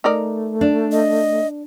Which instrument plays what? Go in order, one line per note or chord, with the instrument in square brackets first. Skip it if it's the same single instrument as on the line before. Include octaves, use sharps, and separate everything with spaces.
[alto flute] A3 [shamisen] D#4 A#4 D5
[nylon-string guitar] D4
[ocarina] D#5